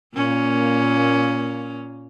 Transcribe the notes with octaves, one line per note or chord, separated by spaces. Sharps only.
A#2 A#3 C#4